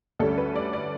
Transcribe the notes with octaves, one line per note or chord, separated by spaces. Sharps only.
D2 D3 G3 C#4 A4
B4
D5
D5